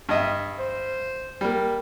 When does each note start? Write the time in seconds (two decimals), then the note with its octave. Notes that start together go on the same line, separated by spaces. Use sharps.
0.09 G2 D#5 E5
0.59 C5
1.41 G3 A#3